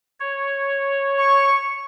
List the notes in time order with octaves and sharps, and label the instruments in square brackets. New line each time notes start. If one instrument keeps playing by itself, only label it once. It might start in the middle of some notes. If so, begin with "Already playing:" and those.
[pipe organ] C#5
[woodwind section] C#6